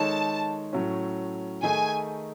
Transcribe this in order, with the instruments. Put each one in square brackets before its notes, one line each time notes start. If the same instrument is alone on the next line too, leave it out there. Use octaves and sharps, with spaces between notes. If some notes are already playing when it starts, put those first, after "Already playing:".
Already playing: [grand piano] D#3 G#3 D#4 A4 C#5 [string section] A5
[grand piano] A2 F#3 A3 C#4
[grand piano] D#3 A3 D#4 G#4 [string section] G#5